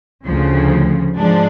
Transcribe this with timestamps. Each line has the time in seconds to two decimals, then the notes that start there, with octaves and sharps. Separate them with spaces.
0.24 D2 C#3 F3
1.18 G#2 F3 G#3 D4